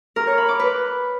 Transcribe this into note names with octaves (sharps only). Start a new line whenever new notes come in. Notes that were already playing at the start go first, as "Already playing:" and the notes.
A#4
C#5
B5
D6
B4